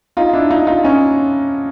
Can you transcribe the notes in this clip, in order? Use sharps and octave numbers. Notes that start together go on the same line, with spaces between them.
D#4 F4
D4 E4
D#4 F4
D#4 F4
C#4 D#4